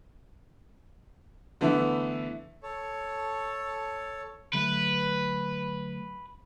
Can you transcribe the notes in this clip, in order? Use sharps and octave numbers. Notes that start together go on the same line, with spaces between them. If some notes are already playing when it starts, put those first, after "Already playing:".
D3 E3 A3 B3 E4
A4 C#5
D3 F#3 A3 B4